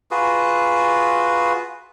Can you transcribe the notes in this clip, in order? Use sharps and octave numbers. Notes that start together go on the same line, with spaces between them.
F4 F#4 G#4 B4